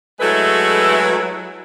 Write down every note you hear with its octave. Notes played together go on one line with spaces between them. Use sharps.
F#3 G#3 A3 E4 A4 B4